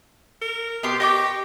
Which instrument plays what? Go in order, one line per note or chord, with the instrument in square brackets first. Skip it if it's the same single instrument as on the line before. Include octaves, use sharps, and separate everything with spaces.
[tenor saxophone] A#4
[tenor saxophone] B2 [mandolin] B3 G4 C6
[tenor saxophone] G4 [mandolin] D#5 C#6 D6